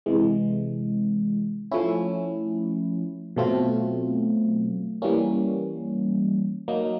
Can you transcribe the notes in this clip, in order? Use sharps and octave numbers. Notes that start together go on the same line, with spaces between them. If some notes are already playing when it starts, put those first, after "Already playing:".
C3 E3 G#3
F3 A3 C#4 E4
B2 F#3 A3 C4 F4
E3 G3 A#3 C#4
F#3 A#3 D#4